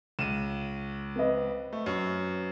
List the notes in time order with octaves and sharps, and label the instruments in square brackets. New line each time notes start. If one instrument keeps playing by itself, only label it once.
[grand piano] C#2 D#7 [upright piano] E7
[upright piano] C4 B4 D#5
[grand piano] A3
F#2